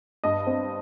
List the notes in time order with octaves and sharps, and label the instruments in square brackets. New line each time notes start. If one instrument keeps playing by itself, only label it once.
[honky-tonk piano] G2 D#5
C4